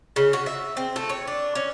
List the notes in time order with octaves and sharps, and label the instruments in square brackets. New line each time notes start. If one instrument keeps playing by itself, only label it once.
[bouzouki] C#3
F#4
E5
C4
A3
C#5
D4
C#4